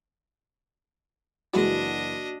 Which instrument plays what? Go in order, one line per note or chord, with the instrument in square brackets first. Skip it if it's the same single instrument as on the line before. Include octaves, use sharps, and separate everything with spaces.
[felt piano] F#1 E3 [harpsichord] G3 G#3 [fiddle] D4 D#5 [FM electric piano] F#4